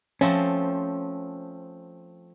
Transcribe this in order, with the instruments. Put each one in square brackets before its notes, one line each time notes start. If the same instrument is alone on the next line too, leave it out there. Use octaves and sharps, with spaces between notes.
[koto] F3 A3 C4 [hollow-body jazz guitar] C#4